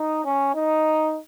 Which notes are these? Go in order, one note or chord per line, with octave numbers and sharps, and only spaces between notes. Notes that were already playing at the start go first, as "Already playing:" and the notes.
Already playing: D#4
C#4
D#4